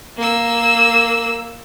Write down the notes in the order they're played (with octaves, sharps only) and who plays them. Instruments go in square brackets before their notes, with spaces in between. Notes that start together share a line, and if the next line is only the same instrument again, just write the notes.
[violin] A#3 E6